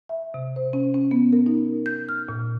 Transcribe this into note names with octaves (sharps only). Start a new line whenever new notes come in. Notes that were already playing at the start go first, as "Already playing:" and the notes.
E5
C3
C5
C#4
C#4
B3
A#4
D#4
G6
F6
A#2